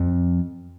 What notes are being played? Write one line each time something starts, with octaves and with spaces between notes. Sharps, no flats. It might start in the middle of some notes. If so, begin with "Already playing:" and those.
Already playing: F2